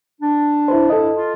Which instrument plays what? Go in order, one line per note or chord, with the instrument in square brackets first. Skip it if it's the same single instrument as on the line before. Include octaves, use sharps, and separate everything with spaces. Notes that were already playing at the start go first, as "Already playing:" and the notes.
[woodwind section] D4
[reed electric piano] E4 B4 C5
[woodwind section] G2 E4 [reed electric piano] A4 D#5
[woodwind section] F4